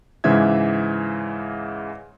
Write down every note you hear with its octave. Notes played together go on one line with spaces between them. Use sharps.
G#2 C#3 E3 E5 G#6